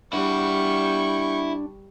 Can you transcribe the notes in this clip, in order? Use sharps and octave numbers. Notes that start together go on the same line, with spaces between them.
G3 D4 E4 F#5 C#6